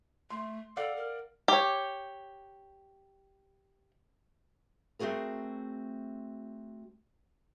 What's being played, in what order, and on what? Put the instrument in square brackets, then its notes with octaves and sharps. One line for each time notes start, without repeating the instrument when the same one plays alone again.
[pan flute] A3 [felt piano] C6
[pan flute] A4 [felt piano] D5 F5 F#5
[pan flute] A#4
[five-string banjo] G4 C#5
[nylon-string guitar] A3 C4 F#4 G#4 A#4